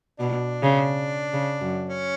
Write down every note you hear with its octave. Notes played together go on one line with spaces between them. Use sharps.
B2 D4
C#3
C#3
F#2
C#4